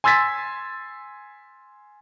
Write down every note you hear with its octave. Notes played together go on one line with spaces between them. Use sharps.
G#5 C6 E6 G#6 A6 B6